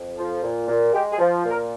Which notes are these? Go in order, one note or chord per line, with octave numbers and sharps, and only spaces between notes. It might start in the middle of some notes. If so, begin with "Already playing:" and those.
Already playing: F2
F3
A#2
A#2
G#3 G4
G#4
F3
A#2
A#4